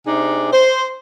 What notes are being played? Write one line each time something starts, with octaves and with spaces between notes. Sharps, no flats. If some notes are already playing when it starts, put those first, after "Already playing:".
C3 D4 D#4 G#4
C5